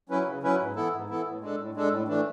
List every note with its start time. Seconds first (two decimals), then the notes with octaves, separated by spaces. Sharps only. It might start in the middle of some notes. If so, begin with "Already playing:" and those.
0.09 F#3 C#4 E4 B4
0.26 C#3
0.43 F#3 C#4 E4 B4
0.59 G#2
0.76 E3 B3 E4 A4
0.92 G#2
1.09 E3 B3 E4 A4
1.25 A2
1.41 G#3 D4 A4
1.58 A2
1.74 G#3 D4 A4
1.90 A2
2.08 E3 A3 D4